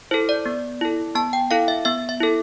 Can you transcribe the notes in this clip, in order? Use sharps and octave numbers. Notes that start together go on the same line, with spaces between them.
E4 A4 C5
D5
B3
E4 A4
B3 A5
G5
E4 A4 F5
E5
B3 E5
E5
E4 A4